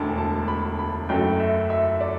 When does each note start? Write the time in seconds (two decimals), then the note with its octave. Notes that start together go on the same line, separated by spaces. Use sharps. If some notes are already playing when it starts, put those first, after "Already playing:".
Already playing: E1 D2 D3 A5
0.18 A5
0.48 B5
0.79 B5
1.09 F#1 F#2 F#3 A3 G5
1.40 E5
1.70 E5
2.01 D5